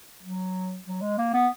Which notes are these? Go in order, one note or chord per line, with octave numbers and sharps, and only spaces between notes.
F#3
F#3
G#3
A#3
B3